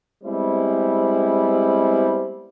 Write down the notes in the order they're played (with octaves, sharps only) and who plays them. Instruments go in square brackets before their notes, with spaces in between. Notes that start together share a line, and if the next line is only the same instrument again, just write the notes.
[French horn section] G3 G#3 B3 C4 E4 C5